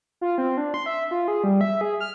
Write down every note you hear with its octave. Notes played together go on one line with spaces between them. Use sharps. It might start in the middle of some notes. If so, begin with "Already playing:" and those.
F4
C4
D4
C6
E5
F4
G#4
G3
E5
G#4
F6